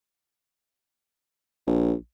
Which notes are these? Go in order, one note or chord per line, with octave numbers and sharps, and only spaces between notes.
A#1